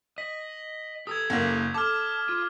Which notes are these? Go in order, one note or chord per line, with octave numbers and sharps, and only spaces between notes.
D#5 B6 F#7
G4 A4 D#6 E6 G#6
F#1 A#3
A4 A5 D6 F6
F4